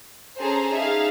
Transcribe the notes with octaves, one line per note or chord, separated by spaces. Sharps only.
C#4 G#4 A4 C5 A#5
D#4 G#4 E5 F5